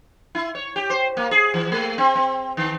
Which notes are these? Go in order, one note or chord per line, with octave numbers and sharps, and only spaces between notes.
E4
C#5
G4
C5
A#3
G#4
E3
A3
C4
C4
D#3